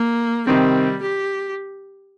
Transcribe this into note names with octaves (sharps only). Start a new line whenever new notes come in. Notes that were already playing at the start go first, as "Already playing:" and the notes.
Already playing: A#3
C3 D#3 G3 C4
G4